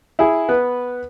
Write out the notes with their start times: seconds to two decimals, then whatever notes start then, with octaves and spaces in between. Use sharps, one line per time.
0.19 E4 G#4
0.49 B3 B4